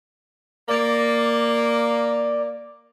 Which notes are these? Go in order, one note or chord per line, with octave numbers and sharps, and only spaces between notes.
A#3 D5